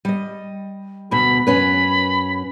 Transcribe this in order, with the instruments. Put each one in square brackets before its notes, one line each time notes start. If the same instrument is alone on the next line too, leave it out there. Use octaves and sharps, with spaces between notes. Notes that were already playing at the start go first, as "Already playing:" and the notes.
[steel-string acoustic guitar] G3 D#5
[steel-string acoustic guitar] D2 B2 [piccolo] B5
[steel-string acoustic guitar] F#2 C#4 B4 [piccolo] B5